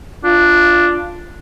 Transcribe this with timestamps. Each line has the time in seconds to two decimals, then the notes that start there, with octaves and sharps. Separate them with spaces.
0.24 D4 F4